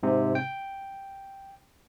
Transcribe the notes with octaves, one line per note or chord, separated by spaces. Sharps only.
G#2 C3
G5